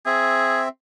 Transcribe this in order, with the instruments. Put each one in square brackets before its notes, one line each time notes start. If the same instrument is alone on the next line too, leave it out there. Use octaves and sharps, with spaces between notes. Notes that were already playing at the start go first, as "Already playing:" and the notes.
[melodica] C4 E5 [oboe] G#4